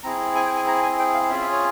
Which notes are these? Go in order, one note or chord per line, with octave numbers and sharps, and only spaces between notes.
C4 E4 G#4 A#5
G#5
G5
G#5
A#5
G#5
G5
F5
C#4 F4 G#4 E5
E5
C#5